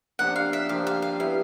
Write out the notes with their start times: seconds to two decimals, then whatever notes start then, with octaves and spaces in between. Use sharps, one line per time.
0.19 F3 A#3 D4 G4 F#5
0.36 F5
0.53 E5
0.69 F3 A#3 D4 G4 F5
0.87 F5
1.02 F5
1.19 G3 B3 E4 F5